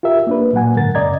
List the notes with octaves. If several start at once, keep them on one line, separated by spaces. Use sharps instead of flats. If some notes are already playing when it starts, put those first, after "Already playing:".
F4 G4 A#4 E5
A#3 D4 B4
A#2 F#3 A#3 F#5 G#5
G#2 D3 A#4 A6
F#2 C#3 D5 D#5 A#5 G#6